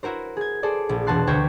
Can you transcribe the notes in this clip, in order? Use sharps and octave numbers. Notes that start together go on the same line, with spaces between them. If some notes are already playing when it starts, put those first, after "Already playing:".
E4 F#4 A#4 C5
G#4 G#6
G#4 A4 C5 D5
A#1
E1 B2 F#4 A5 C6 F#6
D2 C5 G5 C#6 G#6